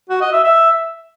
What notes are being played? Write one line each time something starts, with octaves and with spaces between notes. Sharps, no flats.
F#4
D#5
E5
E5